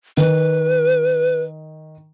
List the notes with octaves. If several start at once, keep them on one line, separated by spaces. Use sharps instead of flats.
D#3 B4